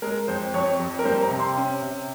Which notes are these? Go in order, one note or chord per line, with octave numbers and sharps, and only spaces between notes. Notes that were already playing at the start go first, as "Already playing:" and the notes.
G#3 A#4
F2 C5
F2 C#5
F2
A#4
G3 C5
A#5
C3
C6
C#4
C3